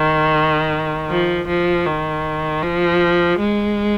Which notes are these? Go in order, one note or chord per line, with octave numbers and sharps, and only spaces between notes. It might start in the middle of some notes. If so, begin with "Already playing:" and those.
Already playing: D#3
F3
F3
D#3
F3
G#3